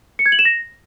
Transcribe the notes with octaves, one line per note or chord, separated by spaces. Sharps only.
C#7
G#6
F#7
E7
A#6